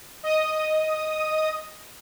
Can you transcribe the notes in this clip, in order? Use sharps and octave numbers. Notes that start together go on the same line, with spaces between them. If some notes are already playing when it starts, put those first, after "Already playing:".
D#5 D#6